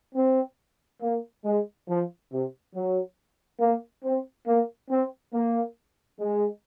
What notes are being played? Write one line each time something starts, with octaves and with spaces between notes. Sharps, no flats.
C4
A#3
G#3
F3
C3
F#3
A#3
C4
A#3
C4
A#3
G#3